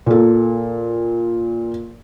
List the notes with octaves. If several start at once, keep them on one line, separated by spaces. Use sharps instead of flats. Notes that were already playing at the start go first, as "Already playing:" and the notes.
A#2 A4